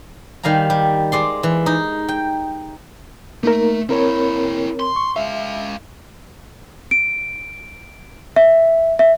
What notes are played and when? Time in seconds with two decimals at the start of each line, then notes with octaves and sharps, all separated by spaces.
0.43 D#3 G3 F5 G#5 A#5
0.70 G3
1.12 G#3 D5 C6
1.43 E3
1.66 D#4
2.08 G5
3.43 A3 A#3 D#4 A#4
3.89 A#3 C4 E4 A#4 C#5
4.80 C6
4.96 C#6
5.16 G#3 E5 F5
6.91 D7
8.36 E5
8.99 E5